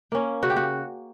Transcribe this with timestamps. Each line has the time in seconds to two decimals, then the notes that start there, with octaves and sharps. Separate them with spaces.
0.12 A#3 C#4
0.43 C#3 F#4
0.50 G4
0.56 F#4